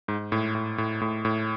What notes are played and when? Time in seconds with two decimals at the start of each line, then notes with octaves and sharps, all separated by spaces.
0.08 G#2
0.32 A2
0.55 A2
0.78 A2
1.01 A2
1.25 A2